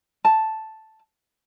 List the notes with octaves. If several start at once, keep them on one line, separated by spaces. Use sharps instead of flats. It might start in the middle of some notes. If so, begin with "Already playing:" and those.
A5